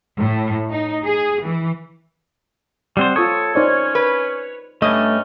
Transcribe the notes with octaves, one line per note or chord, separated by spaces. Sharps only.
A2
D#4
G#4
E3
G3 C4 C5 F#5
F4 A4 C#5 C#6 D#6
C#4 D#4 C5 D5
B4
G2 A3 C#4 D#5